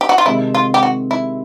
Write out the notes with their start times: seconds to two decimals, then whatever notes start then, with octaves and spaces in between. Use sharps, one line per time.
0.01 G4
0.09 F#4
0.18 F4
0.25 C3 D#3 G#3 C4 D#4 E4
0.55 F4
0.74 G4
0.83 F#4
1.11 E4